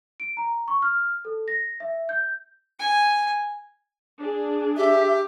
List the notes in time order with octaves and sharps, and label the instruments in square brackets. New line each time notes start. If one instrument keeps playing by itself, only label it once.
[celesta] D7
A#5
C#6
F6
A4
A#6
E5
G6
[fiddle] G#5
[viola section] D4 G#4
[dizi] G4 [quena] E5